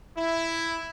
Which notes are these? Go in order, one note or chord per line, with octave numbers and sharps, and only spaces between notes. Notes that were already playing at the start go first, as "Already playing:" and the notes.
E4